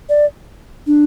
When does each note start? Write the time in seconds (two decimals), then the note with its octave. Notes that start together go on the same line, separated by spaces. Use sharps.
0.09 D5
0.87 D4